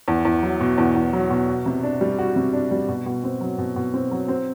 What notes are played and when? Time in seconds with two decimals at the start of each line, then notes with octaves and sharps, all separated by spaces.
0.08 E2
0.25 E2
0.43 F#3
0.60 B2
0.78 E2
0.95 E2
1.13 F#3
1.30 B2
1.47 F#4
1.66 C3
1.83 D4
2.01 G3
2.19 F#4
2.36 C3
2.53 D4
2.71 G3
2.88 B2
3.06 B2
3.24 C4
3.41 F#3
3.58 B2
3.76 B2
3.94 C4
4.11 F#3
4.28 C4